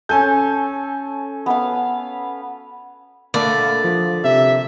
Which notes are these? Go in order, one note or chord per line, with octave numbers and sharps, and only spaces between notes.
C#4 A4 G#5 G6
B3 F5
D3 A3 A#3 D5 F5 A5 B5
F3
C3 E5